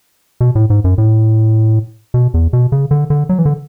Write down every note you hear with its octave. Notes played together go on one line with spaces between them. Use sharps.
B2
A2
G#2
F#2
A2
B2
E2
B2
C#3
D3
D3
F#3
E3
D3